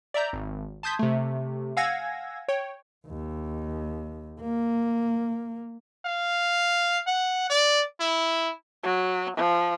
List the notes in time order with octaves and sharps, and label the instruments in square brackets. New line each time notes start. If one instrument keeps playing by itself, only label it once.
[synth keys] D5 E5 A#5 G6
G#1
A5 C6 D#6 G6 G#6 B6
C3 A3
F5 F#5 G#5 E6 G#6 A#6
C#5 G5
[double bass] D#2
A#3
[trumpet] F5
F#5
D5
E4
[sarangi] F#3
F3